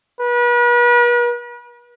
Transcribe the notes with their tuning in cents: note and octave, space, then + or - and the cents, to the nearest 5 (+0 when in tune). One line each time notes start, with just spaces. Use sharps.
B4 -40